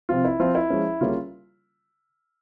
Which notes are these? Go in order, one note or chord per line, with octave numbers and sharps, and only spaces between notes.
C3 F3 C4 F4
E4
F3 C4 F4
E4
F3 G#3 C#4
C#3 G3 A#3 C#4 F4